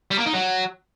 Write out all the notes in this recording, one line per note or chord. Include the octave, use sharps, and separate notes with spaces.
G3
A#3
D#4
F#3